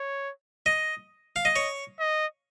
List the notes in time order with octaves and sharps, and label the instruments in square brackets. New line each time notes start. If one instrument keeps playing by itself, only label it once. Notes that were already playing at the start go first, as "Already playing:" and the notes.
Already playing: [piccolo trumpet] C#5
[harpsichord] D#5
F5
D#5
[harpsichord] C#5 [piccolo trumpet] D#5
[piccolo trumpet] D#5